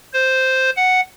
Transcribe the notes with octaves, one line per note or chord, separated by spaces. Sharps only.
C5
F#5